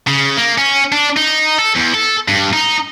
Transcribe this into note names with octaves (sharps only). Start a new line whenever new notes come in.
C#3
A#3
C#4
D4
D#4
A4
E2
A4
G2
D#4